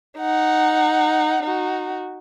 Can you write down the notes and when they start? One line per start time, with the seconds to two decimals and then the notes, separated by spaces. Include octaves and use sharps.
0.19 D#4 F#5
1.43 D#4 F#4